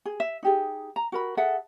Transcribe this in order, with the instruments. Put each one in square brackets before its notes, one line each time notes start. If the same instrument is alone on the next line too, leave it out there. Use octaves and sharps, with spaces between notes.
[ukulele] G#4
E5
D#4 G4 G#4
A#5
F#4 A#4 B5
G#4 A4 E5 F#5